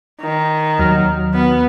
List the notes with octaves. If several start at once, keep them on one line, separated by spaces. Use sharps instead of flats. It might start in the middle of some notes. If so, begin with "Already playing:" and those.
D#3
D#2 F#3 F6
B3